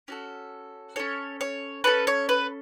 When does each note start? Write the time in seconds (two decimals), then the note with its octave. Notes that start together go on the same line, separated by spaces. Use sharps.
0.08 C#4 F#4 A4
0.96 C#4 A4 C#5
1.41 C#5
1.84 C#4 A4 B4
2.07 C#5
2.29 B4